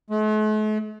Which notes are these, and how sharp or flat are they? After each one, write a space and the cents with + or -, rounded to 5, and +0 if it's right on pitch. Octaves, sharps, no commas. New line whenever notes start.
A3 -45